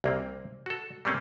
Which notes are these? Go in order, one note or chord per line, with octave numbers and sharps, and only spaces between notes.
C2 A#3 C4
F#4 A4
G3 A3 A#3 C4 C#4